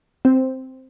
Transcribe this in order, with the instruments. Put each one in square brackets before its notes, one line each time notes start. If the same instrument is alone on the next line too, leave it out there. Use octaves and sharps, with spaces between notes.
[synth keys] C4